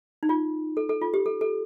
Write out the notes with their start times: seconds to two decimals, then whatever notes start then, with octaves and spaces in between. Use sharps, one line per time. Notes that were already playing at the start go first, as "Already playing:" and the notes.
0.23 D#4
0.29 F4
0.77 A4
0.89 A4
1.01 F4
1.14 G4
1.26 A4
1.41 A4